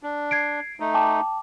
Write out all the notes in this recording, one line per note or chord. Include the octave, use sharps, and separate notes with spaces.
D4
G#6 C7 D7
A3 D#4
G5 A5 D6